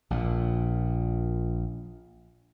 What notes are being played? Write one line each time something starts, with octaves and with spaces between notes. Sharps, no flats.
A#1 A#2